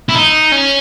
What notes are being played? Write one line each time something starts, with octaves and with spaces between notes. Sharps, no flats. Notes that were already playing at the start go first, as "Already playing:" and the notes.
E4
D#4
C#4